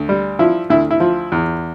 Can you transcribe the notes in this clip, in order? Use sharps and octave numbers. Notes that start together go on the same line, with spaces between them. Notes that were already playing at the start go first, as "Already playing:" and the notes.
Already playing: D2
G3
F3 E4
D2 E4
E4
F3
E2